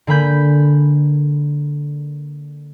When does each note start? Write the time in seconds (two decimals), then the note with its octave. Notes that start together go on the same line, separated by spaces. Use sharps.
0.07 D3 A#3 G#5 B5 G6